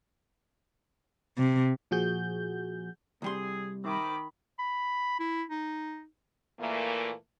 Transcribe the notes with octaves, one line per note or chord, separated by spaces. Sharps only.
C3
A#2 F3 F#4 G#4 G6
C2 G3 C4 G#4 C6
D#3 C5 E5 B5 D6
B5
E4
D#4
A#2 E3 A3 A#3